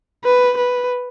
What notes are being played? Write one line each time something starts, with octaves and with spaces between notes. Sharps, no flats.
B4
B4